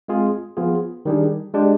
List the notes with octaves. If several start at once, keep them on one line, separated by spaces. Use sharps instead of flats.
G#3 C4 F4 G#4
F3 B3 F4 G#4
D#3 G3 D4 G#4
G#3 D4 G4